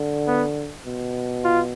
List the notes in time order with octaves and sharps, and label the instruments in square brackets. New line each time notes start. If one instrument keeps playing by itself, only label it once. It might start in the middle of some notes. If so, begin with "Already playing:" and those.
Already playing: [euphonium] D3
[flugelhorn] B3
[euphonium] B2
[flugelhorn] F4